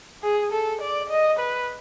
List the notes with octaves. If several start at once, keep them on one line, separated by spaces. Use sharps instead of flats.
G#4
A4
D5
D#5
B4